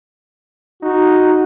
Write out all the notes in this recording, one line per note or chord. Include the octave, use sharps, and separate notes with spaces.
D#4 F#4